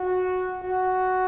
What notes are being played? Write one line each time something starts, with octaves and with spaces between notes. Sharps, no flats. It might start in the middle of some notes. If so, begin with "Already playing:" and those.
Already playing: F#4
F#4